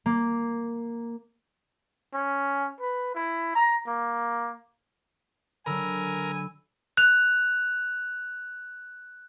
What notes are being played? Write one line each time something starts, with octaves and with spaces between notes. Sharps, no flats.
A#3
C#4
B4
E4
A#5
A#3
D3 F#3 A#4 G#5 B5 E6
F#6 F7